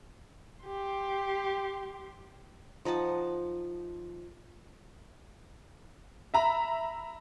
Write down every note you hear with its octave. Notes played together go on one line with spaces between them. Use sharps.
G4 C6
F3 D#4 F#5 A5
E5 A#5 B5